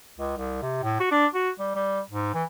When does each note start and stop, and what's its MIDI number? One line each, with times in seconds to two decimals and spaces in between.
0.18 0.35 37
0.37 0.58 36
0.62 0.82 48
0.83 0.95 45
1.00 1.07 66
1.11 1.26 62
1.34 1.51 66
1.59 1.71 55
1.75 2.00 55
2.10 2.32 44
2.34 2.44 52